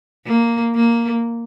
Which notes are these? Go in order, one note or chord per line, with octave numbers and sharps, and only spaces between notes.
A#3
A#3